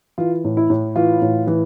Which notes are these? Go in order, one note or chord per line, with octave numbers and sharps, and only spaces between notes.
E3 F4
A2
E4
A2
E3 F4
A2
E3